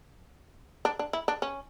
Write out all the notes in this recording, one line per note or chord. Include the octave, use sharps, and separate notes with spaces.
D4
D4
E4
D4
C#4